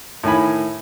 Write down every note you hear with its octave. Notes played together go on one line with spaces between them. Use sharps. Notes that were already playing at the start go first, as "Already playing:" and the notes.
A2 D#3 G#5 B5